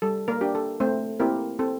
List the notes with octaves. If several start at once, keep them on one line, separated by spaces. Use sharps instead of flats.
G3 A4
A#3 A#4
D4 G4
A4
A3 C4 C5
A#3 C4 E4 G4 A#4
C4 A4